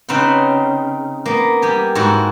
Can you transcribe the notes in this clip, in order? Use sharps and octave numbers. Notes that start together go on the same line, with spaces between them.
C#3 C4 D#4 B4 F#5
A#3 B3
G3 G4 G#5
G#2 E4 F#4 F#5